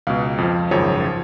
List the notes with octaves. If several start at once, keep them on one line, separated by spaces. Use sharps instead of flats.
C#2 B2 F5
F2 F3
G#1 F#2 C#3 F3 C#5
F3